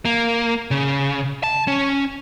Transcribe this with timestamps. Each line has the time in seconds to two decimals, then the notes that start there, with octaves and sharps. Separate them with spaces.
0.05 A#3
0.71 C#3
1.44 A5
1.68 C#4